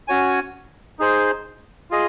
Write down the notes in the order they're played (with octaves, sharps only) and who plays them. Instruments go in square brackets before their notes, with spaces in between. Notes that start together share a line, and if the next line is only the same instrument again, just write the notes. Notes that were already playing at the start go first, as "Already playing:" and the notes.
[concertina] C#4 F#4 C#5 G#5
D#4 G#4 C5
F4 G#4 D#5